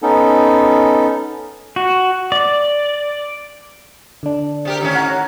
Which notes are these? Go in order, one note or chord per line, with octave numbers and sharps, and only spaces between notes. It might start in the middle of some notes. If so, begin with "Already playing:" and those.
B3 C#4 D#4 A4
F#4
D5
D3 D4
C3 G4 A#4
D#2 A2 C#4
F#5 A#5